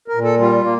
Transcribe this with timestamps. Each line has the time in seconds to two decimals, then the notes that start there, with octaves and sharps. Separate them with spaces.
0.08 A#4
0.15 A#2
0.24 A4
0.39 G3 F4
0.64 A#3